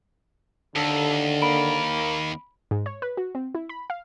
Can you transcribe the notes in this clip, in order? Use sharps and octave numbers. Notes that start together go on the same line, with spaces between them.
D#2 D3 A4
A#3 B5 D7
G#2
C#5
B4
F#4
C4
E4
B5
F5